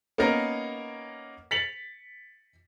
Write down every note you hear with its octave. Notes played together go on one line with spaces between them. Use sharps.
A#3 B3 C#4 D#4 A#4
A6 B6 C#7 F7 F#7